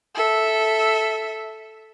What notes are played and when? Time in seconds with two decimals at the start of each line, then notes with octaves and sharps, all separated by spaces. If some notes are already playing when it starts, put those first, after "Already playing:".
0.15 A4 E5